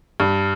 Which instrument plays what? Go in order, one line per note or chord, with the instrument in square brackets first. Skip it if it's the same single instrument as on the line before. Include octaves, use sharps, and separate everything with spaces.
[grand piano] G2